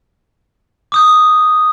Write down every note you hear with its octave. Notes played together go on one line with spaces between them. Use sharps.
D6 D#6 G6